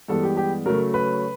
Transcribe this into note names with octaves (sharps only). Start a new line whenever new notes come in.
G2 E3 G#3 B3 A4
G4
G4
C#3 F#3 A3 A#4
B4